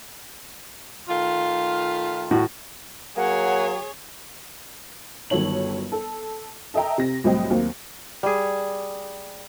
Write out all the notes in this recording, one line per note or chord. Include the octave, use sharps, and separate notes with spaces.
D#3 A3 F4
A2 F#4
F#3 A#3 G#4 C#5 F#5
G1 D#3 F#3 A4 C#5 F#7
A4
A4 D#5 E5 G5 A#5
C3 A#6
C2 A2 F#3 C4 D#5 G5
D#2 F#3 A#3 C4
G3 G#4